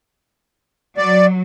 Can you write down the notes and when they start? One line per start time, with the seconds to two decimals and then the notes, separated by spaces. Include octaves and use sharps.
0.97 F#3 D5